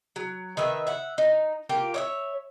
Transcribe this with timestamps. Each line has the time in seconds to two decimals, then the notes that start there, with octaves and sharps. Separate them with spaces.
0.16 F#3
0.57 D#3 B4 E5
0.87 E5 F#5
1.18 D#4
1.69 A#3 F4 G4
1.94 C#5 D#5 E5